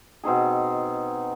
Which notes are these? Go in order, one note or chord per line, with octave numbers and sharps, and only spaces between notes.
B2 C4 D#4 G#4